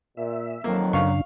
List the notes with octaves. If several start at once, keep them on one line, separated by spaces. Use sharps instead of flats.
A#2 E5
F2 D#3 F#3 A#3
F#2 C#3 D4 F5 C#6